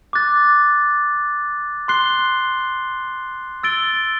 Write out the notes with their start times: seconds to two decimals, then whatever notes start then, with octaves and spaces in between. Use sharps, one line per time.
0.13 D6 F#6 A6
1.88 C6 F#6 C7 G7
3.63 E6 A6 D7 G7